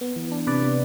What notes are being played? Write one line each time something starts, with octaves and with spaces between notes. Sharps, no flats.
B3
E3
D4
C3 B4 D5
B3